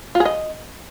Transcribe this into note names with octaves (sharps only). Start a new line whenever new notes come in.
F4
G#4
D#5